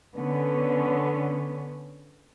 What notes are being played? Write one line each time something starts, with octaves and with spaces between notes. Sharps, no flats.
D3 B3 C#4